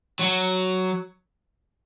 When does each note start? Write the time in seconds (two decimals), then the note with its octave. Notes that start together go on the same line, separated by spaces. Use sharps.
0.19 F#3